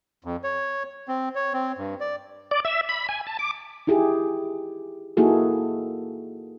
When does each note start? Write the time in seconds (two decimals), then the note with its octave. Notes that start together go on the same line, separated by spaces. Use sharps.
0.24 F2
0.44 C#5
1.08 C4
1.35 C#5
1.54 C4
1.78 G2
2.00 D5
2.51 D5
2.65 E5
2.89 B5
3.09 G#5
3.27 A5
3.39 D6
3.87 D#4 E4 G4 G#4
5.17 A#3 D#4 E4 F#4 G#4 A4